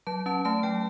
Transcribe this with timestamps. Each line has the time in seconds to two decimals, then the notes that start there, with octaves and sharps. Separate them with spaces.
0.07 F#3 A5
0.26 C#4 A5
0.45 A3 A5
0.63 F#3 G5